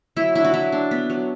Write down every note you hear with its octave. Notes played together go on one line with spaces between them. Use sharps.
F#3 E4
D4 E4
F#4
F#3 E4
D4
B3
F#3